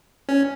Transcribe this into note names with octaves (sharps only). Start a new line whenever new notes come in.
C#4